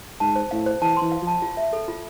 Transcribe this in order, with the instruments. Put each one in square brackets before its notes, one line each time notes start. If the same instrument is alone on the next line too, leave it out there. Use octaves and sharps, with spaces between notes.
[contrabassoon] G#2 [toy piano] A5
[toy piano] C5
[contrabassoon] A2 [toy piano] F5
[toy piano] C5
[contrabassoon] E3 [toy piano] A5
[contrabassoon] E3 [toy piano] C6
[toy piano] F5
[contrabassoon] F3
[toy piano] A5
F4
E5
A4
F4